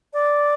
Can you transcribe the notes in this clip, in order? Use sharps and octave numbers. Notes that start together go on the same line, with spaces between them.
D5